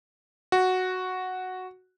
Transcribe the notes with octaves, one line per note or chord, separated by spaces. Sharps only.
F#4